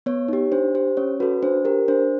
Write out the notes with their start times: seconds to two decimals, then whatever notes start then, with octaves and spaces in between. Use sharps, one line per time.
0.06 B3 C#5
0.28 D#4 G4
0.52 D4 C5
0.75 G4 C5
0.97 C#4 C#5
1.20 F#4 A4 B4
1.42 D4 C5
1.65 G4 A#4
1.88 D4 C5